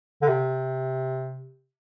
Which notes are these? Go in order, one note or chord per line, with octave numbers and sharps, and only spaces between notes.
D3
C3